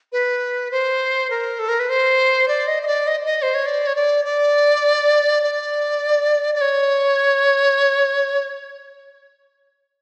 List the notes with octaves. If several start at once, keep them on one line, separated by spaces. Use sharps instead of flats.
B4
C5
A#4
A4
A#4
B4
C5
D5
D#5
D#5
D5
D#5
D#5
C5
C#5
D5
C#5
D5
D5
D5
D5
C#5